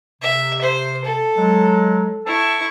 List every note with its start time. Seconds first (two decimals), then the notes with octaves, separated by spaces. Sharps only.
0.22 C3 E5
0.61 C5
1.05 A4
1.37 F#3 G#3
2.26 E4 A5 C#6 E6